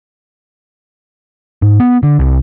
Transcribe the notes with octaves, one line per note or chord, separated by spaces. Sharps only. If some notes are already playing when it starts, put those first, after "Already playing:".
G#2
B3
D3
C2